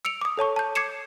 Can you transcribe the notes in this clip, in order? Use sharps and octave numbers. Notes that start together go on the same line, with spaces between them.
E6 C#7 D7 F7
D6 D#6
A4 C#5 A5 C#6
A5 G6
D6 G#6 C7 C#7 E7